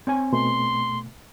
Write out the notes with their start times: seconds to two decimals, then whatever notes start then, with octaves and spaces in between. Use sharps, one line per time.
0.07 C4 C#5 G#5
0.33 B2 A3 C6